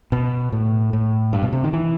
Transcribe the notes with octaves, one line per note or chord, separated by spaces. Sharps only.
B2
A2
A2
G2
B2
C3
D#3
E3